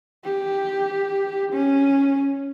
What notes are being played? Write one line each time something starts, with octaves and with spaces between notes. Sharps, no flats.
G4
C#4